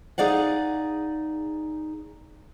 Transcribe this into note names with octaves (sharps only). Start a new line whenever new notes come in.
D#4 G#4 D5 F5 F#5